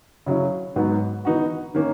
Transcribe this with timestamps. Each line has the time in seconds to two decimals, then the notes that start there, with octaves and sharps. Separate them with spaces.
0.26 C#3 F#3 C#4 E4
0.76 G#2 F#3 B3 F#4
1.25 E3 B3 D#4 F#4
1.75 D#3 A#3 C#4